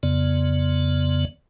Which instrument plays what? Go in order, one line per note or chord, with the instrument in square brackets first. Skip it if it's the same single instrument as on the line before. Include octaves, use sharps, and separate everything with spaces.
[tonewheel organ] F2 C#3 B3 D5